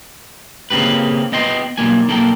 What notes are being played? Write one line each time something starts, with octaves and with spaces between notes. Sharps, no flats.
C#3 A#3 C4 G4 B4
B3 D#5 G5 C6
B1 G2 G3 A#3 G#5
B1 A#3 A4 A#4 F5 G5